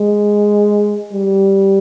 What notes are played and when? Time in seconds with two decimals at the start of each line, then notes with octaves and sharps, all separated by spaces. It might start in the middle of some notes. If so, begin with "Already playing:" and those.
Already playing: G#3
1.13 G3